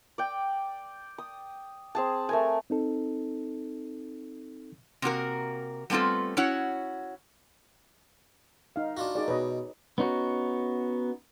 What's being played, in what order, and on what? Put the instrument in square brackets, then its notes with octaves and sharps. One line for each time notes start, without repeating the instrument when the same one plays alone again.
[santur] D5 G5
D#6
C4 G#4 A5
A3 A#4 G#5
[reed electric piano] C4 D#4 A4
[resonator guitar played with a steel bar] C3 A#3 F#4 A#4
G3 A3 B3 C4 F4 A4
C#4 E4 F#4 C#5 F#5
[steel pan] D#4 F5
[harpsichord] D4 F4 F#4
[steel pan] D#4 G#4 D5
[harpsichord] B2 [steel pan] B4 C#5 D#5
[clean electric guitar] B3 C#4 D#4 F#4